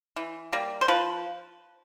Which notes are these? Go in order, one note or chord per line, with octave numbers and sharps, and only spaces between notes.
E3
G3 A#3
C5
F3 B4